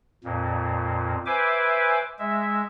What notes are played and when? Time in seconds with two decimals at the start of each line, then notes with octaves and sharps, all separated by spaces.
0.24 F2 A#2
1.26 B4 C5 E5 G#5 D6
2.19 G#3 E5